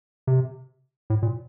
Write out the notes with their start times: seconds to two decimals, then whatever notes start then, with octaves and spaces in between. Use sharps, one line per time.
0.27 C3
1.10 A2
1.22 A#2